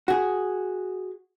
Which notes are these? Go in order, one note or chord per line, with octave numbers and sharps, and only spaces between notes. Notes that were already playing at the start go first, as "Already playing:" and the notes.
F#4 G#4